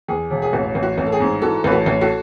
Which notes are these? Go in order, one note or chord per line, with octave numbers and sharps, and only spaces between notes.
E2 G#4
E1
G#4
A1 F#4
A1
F#4
A1
A4
G#4
G#2
E3 F#4 A4
A1 B4
F#4 A4
A1
F#4 A4